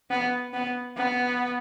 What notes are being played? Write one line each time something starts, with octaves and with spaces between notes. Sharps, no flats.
B3
B3
B3